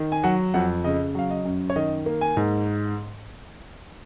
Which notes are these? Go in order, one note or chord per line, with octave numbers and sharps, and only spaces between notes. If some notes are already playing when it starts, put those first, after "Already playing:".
Already playing: D#3
G#5
F#3 F#5
F2 F#5
C#3 D#5
F#3 F5
D#5
F#2
C#5
D#3 D#5
A#3
G#5
G#2